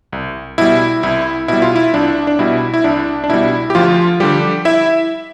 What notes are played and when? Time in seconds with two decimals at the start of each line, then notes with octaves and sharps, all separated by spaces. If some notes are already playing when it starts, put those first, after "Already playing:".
0.12 C2
0.58 B2 G3 E4
1.03 C2 E4
1.48 B2 G3 E4
1.62 F4
1.76 E4
1.94 C2 D4
2.27 D4
2.39 B2 G3 E4
2.74 E4
2.84 C2 D4
3.24 D4
3.29 B2 G3 E4
3.70 G4
3.75 D2 F3 F4
4.20 D3 F3 G3 G4
4.65 E4 E5